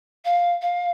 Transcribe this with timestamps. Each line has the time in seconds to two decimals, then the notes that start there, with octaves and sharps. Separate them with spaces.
0.25 F5
0.62 F5